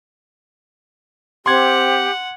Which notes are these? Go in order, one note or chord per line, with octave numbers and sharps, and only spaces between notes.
C4 G4 F#5 C6 D6 G#6